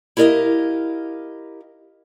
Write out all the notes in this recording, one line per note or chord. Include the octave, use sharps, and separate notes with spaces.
E4 G4 A#4 D5 D#5 F5